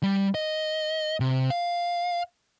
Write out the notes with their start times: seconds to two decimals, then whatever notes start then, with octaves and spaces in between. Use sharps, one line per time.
0.03 G3
0.35 D#5
1.20 C3
1.50 F5